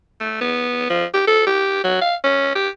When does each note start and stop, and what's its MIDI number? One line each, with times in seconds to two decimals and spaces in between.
0.21 0.37 57
0.41 0.88 59
0.90 1.05 53
1.14 1.22 67
1.27 1.43 69
1.47 1.82 67
1.84 1.99 54
2.02 2.15 77
2.24 2.55 61
2.55 2.69 67